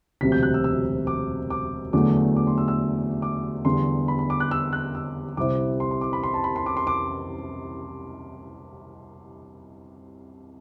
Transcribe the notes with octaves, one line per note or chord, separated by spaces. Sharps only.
E1 D2 C3 F#3 B6
G6
F#6
E6
E6
D6
D6
E2 D3 F#3 A3 D6
D6
C6
E6
E6
D6
E2 D3 G3 C6
B5
B5
D6
F#6
E6
F#6
E6
C2 C3 G3 C4 E4 D6
C6
C6
D6
B5
C6
A5
B5
C6
D6
C6
D6